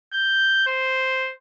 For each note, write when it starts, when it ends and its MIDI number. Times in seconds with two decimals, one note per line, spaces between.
0.13 0.65 91
0.67 1.32 72